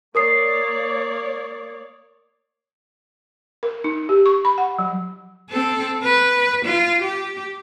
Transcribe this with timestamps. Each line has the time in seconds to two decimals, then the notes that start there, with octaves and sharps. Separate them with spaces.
0.15 A#3 A#4 C#5 D5 D#6 C7
3.63 A#4
3.84 D#4
4.09 G4
4.26 C#6
4.45 B5
4.58 F#5
4.79 F#3
5.50 C4 A4
6.04 B4
6.65 F4
7.02 G4